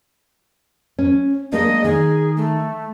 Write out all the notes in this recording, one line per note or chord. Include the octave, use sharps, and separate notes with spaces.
C#4
G#3 A#3 D4 D#5
D#3 G#4
A3